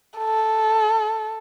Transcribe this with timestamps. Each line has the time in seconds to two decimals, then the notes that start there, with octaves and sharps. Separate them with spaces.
0.18 A4